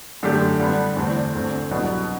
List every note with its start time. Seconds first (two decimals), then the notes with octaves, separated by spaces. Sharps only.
0.23 F#2 D3 A3 D4 G4
0.59 D3 G3 B3 D4
0.97 E2 D3 A3 C4
1.33 D2 D3 A3 C4
1.71 C2 B2 F#3 B3 D4